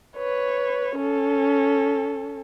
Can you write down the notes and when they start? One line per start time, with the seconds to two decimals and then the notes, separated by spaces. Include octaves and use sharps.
0.17 B4 C#5
0.96 C#4 A4